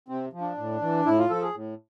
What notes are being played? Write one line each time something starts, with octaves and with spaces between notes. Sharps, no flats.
C3 C4
F3
D4
A2
E3
A2 E4
F4
F3 A4
G#4
A2